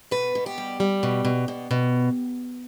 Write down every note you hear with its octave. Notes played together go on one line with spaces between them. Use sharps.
B2 B4
B2
G4
G3
G3
B2
B2
B2
B2